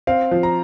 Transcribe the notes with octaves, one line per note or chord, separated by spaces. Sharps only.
C4 F5
F3
A#5